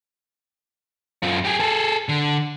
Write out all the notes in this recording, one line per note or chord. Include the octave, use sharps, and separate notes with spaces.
F#2 F4
G4 G#4
G#4 A4
D3